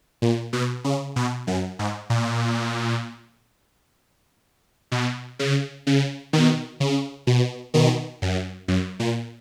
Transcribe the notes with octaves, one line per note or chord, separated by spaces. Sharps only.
A#2
B2
C#3
B2
F#2
G#2
A#2
B2
C#3
C#3
B2 D#3
C#3
B2
B2 D#3
F#2
F#2
A#2